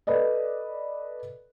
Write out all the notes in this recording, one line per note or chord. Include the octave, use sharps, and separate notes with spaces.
A4 B4 D5 D#5